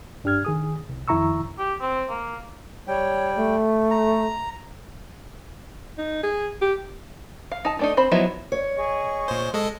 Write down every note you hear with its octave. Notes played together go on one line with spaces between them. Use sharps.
G2 D4 G4 F6 G#6
D#3 G#4 D#6
C2
F2 D#3 E4 A#5 C#6 E6
G4
C4
A#3
G3 C#5 G5
A3
A#5
D#4
G#4
G4
F5
D#4 A5
A3 D4 D#4
C4 C5 B5
F3 F#3 B3 D#4 E4
C#5
G#4 D#5 C#6
A#2 C5
G#3 A4 D#5